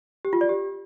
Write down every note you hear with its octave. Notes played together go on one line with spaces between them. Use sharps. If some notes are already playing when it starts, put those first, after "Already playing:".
G4
F4
D5
G4